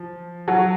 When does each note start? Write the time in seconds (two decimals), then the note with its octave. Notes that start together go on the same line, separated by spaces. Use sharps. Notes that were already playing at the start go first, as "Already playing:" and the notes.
Already playing: F3
0.48 F#3 F#4